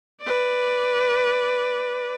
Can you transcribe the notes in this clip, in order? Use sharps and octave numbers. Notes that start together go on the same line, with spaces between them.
B4 D5